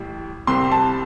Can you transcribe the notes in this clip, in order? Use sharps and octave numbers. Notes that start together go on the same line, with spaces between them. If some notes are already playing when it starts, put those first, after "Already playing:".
Already playing: A1 A2 G3
C2 C3 G3 C4 C6
A5